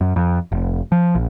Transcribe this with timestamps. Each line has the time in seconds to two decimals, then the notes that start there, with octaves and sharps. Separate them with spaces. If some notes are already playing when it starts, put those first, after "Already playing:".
0.01 F#2
0.16 F2
0.52 F1
0.92 F3
1.15 A#1